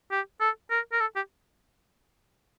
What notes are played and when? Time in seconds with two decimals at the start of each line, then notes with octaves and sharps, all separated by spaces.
0.11 G4
0.40 A4
0.70 A#4
0.92 A#4
1.00 A4
1.16 G4